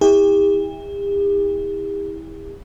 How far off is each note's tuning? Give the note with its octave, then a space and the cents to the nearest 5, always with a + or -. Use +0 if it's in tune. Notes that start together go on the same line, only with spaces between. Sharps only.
E4 -30 G4 +45